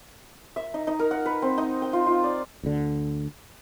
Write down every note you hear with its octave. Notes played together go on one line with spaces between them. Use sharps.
E5
D#4
D#4
A#4
F#5
B4
C4
D#4
G5
F4
F4
D5
D2 D3